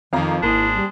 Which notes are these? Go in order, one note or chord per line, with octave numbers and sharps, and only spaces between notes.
F2 D#3 F3 F5 A#5
G#1 A#3 D4 E4 G#4 C5
G3